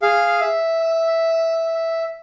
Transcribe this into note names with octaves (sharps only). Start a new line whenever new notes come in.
G#4 F5
E5